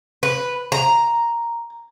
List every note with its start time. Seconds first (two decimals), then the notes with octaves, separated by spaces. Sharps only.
0.23 B4
0.72 A#5